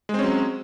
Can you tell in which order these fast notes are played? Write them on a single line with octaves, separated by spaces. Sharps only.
G#3 C4 C#4 F#3